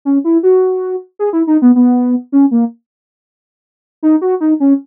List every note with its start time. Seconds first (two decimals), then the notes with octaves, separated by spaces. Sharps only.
0.05 C#4
0.24 E4
0.43 F#4
1.19 G#4
1.33 E4
1.47 D#4
1.62 B3
1.76 B3
2.32 C#4
2.51 A#3
4.03 D#4
4.22 F#4
4.41 D#4
4.60 C#4